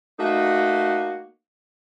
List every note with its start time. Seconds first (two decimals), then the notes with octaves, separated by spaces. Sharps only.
0.19 A3 A#3 D#4 F#4